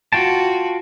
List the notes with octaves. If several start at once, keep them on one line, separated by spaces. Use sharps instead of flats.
F4 F#4 G5 A5